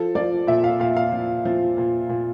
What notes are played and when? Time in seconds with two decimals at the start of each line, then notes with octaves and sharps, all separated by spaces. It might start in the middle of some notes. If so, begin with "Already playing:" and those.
Already playing: F3 A4
0.15 F3 D5
0.47 A#2 E5
0.64 F5
0.80 A#2 F5
0.96 F5
1.12 F3
1.45 F3
1.77 A#2
2.09 A#2